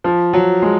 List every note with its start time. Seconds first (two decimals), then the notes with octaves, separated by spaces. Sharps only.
0.04 F3
0.33 F#3
0.62 G#3